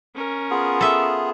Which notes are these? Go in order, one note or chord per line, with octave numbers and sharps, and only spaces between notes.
C#4 A#4
B3 F4 G#4
A4 E5